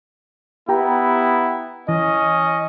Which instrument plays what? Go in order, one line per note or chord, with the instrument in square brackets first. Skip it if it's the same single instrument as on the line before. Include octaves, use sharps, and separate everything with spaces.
[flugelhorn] B3 [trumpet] E4 [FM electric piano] G4 G5 A#5
[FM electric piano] E3 [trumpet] C#4 [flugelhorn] D#5